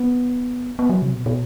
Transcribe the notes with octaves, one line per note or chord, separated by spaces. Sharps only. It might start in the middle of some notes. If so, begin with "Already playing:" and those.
Already playing: B3
B3
F#3
C3
B2
B2